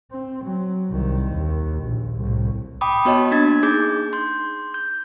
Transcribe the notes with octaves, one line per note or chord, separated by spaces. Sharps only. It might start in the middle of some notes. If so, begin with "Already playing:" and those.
C4
F#3
C2 D#3
D#2
A#1
C2 A2
G5 B5 D6 D#6
B3 F#4 C#5 D#5 A5
A#3 D4 G#6 A6
D#4 G#4 D6 G6
C6 G6
G6